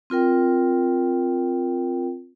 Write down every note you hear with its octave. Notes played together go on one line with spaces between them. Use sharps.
C4 F4 A#4 G5